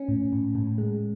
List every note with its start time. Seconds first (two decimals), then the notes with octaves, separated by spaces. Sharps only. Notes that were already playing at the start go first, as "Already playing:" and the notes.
Already playing: C#4
0.08 A2
0.32 A2
0.55 A2
0.78 G#3